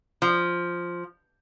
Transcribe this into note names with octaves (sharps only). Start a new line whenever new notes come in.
F3